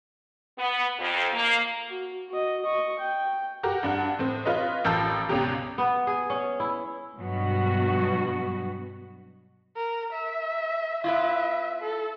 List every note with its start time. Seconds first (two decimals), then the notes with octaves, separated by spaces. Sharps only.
0.57 B3
0.99 F2
1.33 A#3
1.88 F#4
2.29 F#4 D#5
2.62 D#5 C#6
2.99 G5
3.63 F#4 G4 A#4
3.83 G2 D4 F#5
4.19 A2 C4
4.45 F4 B4 C#5 D#5
4.85 A1 F3 A#4 A5 E6 G6
5.29 G#1 C#2 B2 C#4 G4 A#5
5.78 B3
6.07 G#4
6.30 C#4
6.60 E4
7.18 G2 B2 F#3 B3 F#4
9.76 A#4
10.13 E5
11.04 B3 E4 F4 E5
11.82 A4